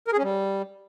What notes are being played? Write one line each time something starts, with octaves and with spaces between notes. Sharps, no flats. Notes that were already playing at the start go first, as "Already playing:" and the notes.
A#4
G#4
C#4
G3